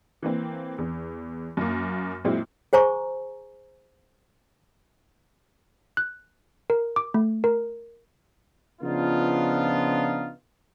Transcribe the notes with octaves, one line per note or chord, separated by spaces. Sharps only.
E3 A#3 C4
E2
F#2 A#3
A#2 F#3 G#3 C4 E4
G#4 C5 G#5 A#5 C#6
F#6
A#4
D6
A3
A#4
C#3 F3 B3 D4 D#4 F4